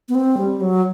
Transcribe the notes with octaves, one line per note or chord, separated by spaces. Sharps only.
B3
C4
G3
F#3